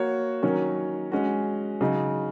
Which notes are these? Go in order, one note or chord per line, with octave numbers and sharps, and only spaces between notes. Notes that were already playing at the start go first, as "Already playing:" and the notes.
Already playing: A#3 F#4 C#5
D#3 F#3 C#4 A#4 C#5
G#3 C#4 F#4
C#3 F#3 D#4